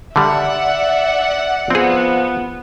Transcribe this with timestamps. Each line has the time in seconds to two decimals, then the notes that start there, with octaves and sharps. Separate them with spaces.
0.16 D3 G3 D5 E5 F#5
1.70 F3 B3 C4 G#4